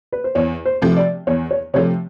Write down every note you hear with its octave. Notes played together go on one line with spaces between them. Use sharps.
B4
C5
E2 C#5
C5
C3 F3 A3
D5
E2 C#5
C#5
C3 F3 A3 C#5